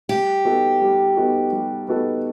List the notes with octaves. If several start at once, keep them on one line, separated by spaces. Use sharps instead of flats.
G3 G4
B3 D#4 F#4 A4
G3
B3 D#4 F#4 A4
G3
B3 D#4 F#4 A4